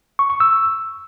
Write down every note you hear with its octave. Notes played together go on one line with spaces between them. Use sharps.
C#6
C#6
E6